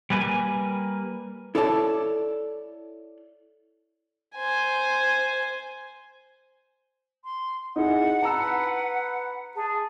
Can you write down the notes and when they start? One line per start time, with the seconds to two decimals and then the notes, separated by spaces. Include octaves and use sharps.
0.10 G3 A#3 B4 G#5
1.55 E4 A4 C#5 D5 G#5 A5
4.36 C5 G#5
7.24 C6
7.76 D#4 E4 G#4 F#5
8.22 B4 A5 A#5 E6
9.56 G#4 A5